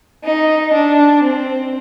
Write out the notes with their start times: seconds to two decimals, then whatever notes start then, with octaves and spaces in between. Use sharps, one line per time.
0.24 D#4
0.73 D4
1.23 C4